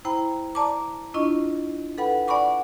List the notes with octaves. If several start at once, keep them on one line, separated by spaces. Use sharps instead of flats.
E4 C5 G5 A#5 B5
D5 A5 A#5 D6
D4 E4 F4 D#5 C#6
A4 B4 F#5 G5 B5
D5 F#5 G#5 B5 C#6 D6